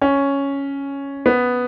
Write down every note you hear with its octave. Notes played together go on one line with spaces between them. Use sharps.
C#4
B3